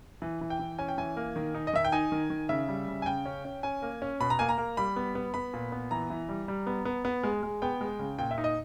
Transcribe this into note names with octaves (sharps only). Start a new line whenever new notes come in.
E3
E3
G5
E3
C#4 G#5
G5
E3 G#5
A#3
D#3
D#4
D#5
D#3 E5
G5
D#4 G#5
D#3
D#3
C#3 E5
G3
C#3
G#5
C#3 G5
C#4
C#4
C#4 G#5
A#3
C#4
B2 B5
A#5
A#3 G#5
A#5
A#3
G3 B5
B3
B3
B3 B5
A#2
B3
E3 A#5
E3
G3
G3
B3
B3
B3
G#3
G#3
B3 G5
G#3
C#3
A#2 G5
E5
D#4
D#5